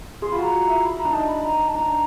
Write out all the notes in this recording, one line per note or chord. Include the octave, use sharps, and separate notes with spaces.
G#4 C6
F4 B5
F#4
A#5
E4
B5
A#5
D4
D#4 A5
B5
A#5
A5
D4 A#5